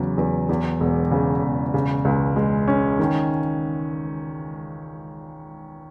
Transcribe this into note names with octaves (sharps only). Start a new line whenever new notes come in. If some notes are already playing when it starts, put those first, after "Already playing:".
Already playing: E2 C#3 F#3
E2
E2
E1
C#3
E1
C#3
C#2
G#3
C#4
D#3